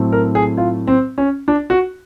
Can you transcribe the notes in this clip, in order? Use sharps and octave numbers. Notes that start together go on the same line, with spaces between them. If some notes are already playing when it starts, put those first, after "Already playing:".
Already playing: A2 F#3 A3 C4
A#4
G#4
F4
C4
C#4
D4
F#4